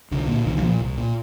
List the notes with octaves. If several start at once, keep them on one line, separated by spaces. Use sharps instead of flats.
C2 D3
A#2
C2 D#3
D3 F3
A#2
C2
A#2